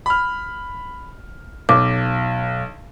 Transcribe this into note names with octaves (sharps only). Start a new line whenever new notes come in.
B5 F6
B1 D6